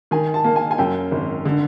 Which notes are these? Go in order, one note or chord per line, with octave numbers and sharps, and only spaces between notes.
D#3 G#5
A5
A#3
G#5
G#5
F#2 G5
G#1
D3